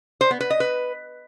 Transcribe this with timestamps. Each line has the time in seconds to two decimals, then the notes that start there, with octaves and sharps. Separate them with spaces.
0.21 C5
0.31 B3
0.40 B4
0.50 D#5
0.60 B4